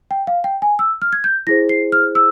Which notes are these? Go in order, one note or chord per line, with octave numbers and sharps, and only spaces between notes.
G5
F5
G5
G#5
E6
F6
G#6
G6
E4 G#4 C5 A#6
C7
F6
E6